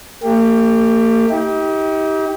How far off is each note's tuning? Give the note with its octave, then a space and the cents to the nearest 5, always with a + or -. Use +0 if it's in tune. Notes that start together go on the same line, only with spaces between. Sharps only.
A#3 -45 G4 +15
D#4 +40 G4 +0